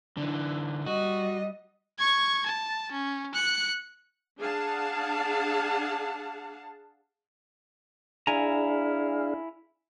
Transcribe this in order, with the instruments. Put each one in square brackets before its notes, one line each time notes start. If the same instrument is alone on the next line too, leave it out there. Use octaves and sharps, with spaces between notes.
[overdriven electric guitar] D3 E3
[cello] G3 D#5 [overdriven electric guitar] F#4
[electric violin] C#6 G#6
A5
C#4
F#6 C#7
[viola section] D4 G#4 F5 F#5 A5
[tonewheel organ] D4 G#4 F5 [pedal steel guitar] E4 G#5 A#5